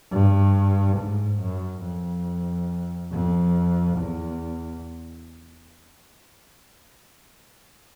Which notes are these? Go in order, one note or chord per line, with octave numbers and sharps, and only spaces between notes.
G2
G#2
F#2
F2
F2
E2